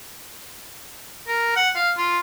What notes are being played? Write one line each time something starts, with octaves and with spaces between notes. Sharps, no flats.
A#4
F#5
F5
F4